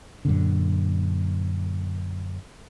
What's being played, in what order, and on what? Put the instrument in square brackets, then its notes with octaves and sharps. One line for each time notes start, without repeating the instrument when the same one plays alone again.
[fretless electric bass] F#2 A#2 D3